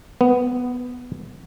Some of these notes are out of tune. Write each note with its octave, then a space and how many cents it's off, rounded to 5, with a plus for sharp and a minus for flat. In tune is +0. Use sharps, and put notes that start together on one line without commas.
B3 +5